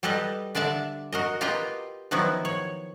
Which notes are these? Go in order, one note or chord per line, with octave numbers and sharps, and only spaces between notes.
G3 G4 A4 B4 D#5
D3 D4 D5 E5 A5
F#4 A#4 D#5
F4 G4 A#4 B4 D#5 G5
D#3 F3 F#3 B3 D#4 E4
C#5